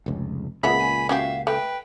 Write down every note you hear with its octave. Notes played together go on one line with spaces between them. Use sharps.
F1 C#2
C#2 A#2 C#3 B3 E5 B5
G#5
C#4 F#4 G4 E5 F5
A3 B4 G5